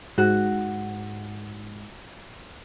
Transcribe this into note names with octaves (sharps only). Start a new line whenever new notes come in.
G#2 F#4